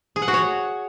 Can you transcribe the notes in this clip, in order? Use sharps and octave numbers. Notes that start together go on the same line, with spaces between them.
G#4
F#5
F#4
C#5